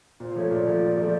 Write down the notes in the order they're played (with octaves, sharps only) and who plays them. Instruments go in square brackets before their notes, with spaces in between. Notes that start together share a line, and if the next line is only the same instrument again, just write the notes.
[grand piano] A#2 [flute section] C5
[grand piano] F3 A3 [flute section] C#5
[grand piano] A#2 [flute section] D5
[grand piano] F3 A3
A#2
F3 A3